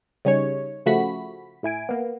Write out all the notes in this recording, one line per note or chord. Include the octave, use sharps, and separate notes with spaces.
C#3 G3 C#4 D#4 C#5
C#3 F3 A3 F#4 B5 B6
A2 E4 G#5 D7
A#3 B3